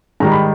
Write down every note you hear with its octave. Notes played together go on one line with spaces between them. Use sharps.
G#2 D#3 G3 A#5
B5